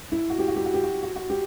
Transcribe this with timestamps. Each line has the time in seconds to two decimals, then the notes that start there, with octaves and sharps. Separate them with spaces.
0.12 E4
0.30 F#4
0.39 G4
0.48 F#4
0.56 G4
0.65 F#4
0.74 G4
0.83 F#4
1.03 F#4
1.16 F#4
1.30 G4